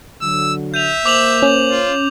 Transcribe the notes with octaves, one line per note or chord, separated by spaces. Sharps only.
D3 F#3 E6
E5 G6 D#7 F7
A#3 C5 D6 F7 F#7
C#4
F4